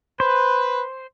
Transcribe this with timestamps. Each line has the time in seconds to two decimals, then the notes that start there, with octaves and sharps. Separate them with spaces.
0.20 B4 C5